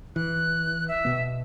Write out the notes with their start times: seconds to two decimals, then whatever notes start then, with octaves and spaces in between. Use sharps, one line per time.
0.16 E3 F#6
0.88 E5
1.05 B2 B3